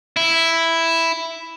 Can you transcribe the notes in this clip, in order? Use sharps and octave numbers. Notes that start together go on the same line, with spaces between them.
E4